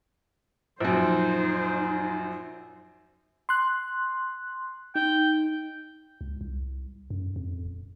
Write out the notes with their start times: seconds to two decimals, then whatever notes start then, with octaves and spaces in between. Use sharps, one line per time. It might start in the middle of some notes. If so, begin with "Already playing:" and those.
0.80 A#1 F#2 D#4 C5
3.49 C6 F#6
4.95 D#4 G5
6.21 C#2
6.41 C2
7.10 F#2
7.36 F2
7.65 D#1